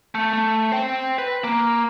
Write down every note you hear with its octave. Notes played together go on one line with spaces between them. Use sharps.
A3
A3
C5 G5
B4
A#3